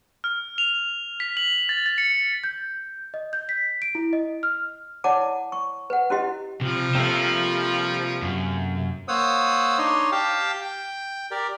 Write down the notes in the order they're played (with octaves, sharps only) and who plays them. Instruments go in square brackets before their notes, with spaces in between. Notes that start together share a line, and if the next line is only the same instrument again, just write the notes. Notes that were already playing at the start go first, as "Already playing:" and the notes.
[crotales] F6
F7
B6
F#7
A6
A6
C#7
[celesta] G6
D#5
G6
B6
D7
E4
D#5
F6
[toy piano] E4 C#5 D5 F#5 A5 D6
C#6
B4 F#5
C#4 E4 F#4 G4 D#5
[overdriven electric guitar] C3 [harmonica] F3 G3
[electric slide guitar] C3 A3 A#3 [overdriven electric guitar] C5 F5
[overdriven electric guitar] F#2
[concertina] A#3 C5 C#5 F#5 D#6 E6
D4 D#4 C#5 D#5 C6
G4 F5 G5 A5
G5
G4 A#4 D5